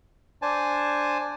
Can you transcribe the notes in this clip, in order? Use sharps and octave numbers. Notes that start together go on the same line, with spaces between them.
D4 C5 G#5 A5